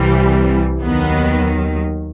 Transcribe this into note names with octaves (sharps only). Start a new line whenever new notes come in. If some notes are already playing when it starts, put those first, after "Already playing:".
Already playing: C2 C3 E3 G3
D#2 D#3 F#3 B3